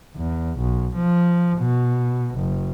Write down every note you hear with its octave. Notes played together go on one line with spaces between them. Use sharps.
E2
B1
F3
B2
F#1